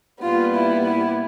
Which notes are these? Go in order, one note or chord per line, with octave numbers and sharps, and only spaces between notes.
A#2 G3 B3 F4
E4
E4